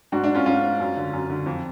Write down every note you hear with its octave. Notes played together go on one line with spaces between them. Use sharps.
G#2 D4 F#4
D4
C#4 F4
G#2 C#4 F4
F#2
D3
F#2
D3
F2